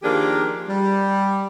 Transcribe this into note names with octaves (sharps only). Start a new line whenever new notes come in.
D#3 F3 A#3 D4 G4 G#4
G3